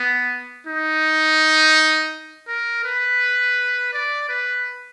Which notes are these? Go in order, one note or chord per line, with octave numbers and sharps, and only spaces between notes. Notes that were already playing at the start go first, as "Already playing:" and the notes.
Already playing: B3
D#4
A#4
B4
D5
B4